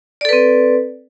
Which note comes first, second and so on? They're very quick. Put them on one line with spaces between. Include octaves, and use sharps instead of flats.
D5 A4 B4 C4